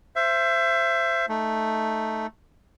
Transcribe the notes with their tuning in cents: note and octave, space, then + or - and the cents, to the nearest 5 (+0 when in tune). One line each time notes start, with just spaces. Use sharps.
C5 +0 E5 +30
A3 +0 D#4 +0